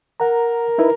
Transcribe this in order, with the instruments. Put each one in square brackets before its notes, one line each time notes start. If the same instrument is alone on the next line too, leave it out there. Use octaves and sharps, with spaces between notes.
[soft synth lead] A#4 [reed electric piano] F#5 A#5
[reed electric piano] D#4 E4 B4